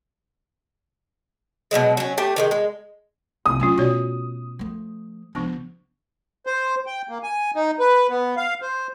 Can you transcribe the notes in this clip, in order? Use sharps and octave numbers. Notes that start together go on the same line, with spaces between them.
B2 D#3 F#3 G#3
F#3 C#4
A3 G4 A5
D#3 G3 G#3
G#3
C2 F3 D#6
F#3 A3 C#4 D4 F4
B2 F#4 C#5 D5
F3 A3
C#2 F3 B3 D4
C5
G5
A#3
G#5
D#4
B4
B3
F5
C5